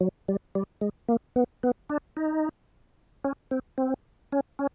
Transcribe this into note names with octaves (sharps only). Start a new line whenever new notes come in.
F#3
G3
G3
G#3
A#3
B3
B3
D4
D#4
C#4
C4
C4
C#4
C#4